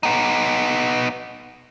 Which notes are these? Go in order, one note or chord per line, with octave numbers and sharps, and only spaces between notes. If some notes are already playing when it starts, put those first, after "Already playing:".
B3 D#4